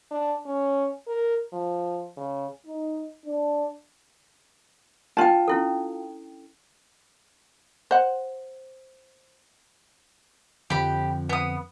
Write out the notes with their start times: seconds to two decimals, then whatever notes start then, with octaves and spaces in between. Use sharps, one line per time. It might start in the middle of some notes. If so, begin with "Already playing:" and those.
0.11 D4
0.46 C#4
1.08 A#4
1.53 F3
2.17 C#3
2.67 D#4
3.26 D4
5.17 D4 F4 G5 A5
5.48 C#4 E4 A4
7.91 C5 F#5
10.70 F2 D3 F3 G4 B5
11.29 B3 D#6